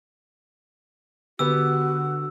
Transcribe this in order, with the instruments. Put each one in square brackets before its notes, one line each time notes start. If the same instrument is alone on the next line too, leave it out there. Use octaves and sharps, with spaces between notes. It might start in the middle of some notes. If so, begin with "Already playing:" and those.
[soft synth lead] D3 [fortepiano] B3 G4 [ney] F#4 [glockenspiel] E6